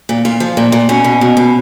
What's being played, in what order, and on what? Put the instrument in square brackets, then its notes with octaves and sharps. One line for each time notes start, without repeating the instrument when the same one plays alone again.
[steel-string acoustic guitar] A#2
A#2 F4
F3
A#2
A#2
B2 C#4
B2
B2
B2